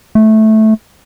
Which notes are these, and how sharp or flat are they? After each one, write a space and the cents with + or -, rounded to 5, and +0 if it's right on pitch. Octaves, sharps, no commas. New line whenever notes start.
A3 -10